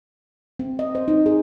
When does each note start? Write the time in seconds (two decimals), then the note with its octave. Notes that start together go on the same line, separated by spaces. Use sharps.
0.59 C4
0.79 D#5
0.95 C5
1.08 D#4
1.26 G#4